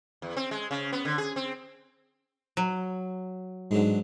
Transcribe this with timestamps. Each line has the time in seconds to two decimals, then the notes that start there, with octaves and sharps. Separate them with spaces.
0.22 E2
0.36 C4
0.51 G#3
0.71 C#3
0.93 B3
1.05 D3
1.18 G#4
1.36 C4
2.57 F#3
3.71 G#2 D3 F#3 G#3